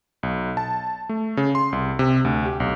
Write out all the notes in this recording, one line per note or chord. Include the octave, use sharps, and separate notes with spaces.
B1
A5
A3
C#3
C6
C2
C3
D2
G4
B1